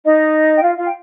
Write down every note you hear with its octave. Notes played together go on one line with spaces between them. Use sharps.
D#4 D#5
G5
F4 F5
F4 F5
G5